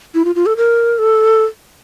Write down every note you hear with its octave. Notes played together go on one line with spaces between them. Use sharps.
E4
F4
F4
A4
A#4
A4